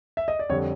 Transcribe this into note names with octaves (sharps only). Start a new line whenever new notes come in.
E5
D#5
D5
F2 D3 G3 C#5